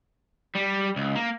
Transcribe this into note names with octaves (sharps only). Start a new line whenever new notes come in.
G3
C#2
A#3